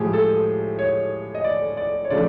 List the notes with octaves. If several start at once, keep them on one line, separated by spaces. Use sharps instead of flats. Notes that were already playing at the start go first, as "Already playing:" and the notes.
Already playing: A2 F3 G#3 G4 G#4
A4
C#5
D#5
D5
D5
C#5
C#3 F3 A3 D5